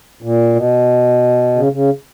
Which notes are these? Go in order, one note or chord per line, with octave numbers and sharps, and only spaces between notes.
A#2
B2
C#3
C#3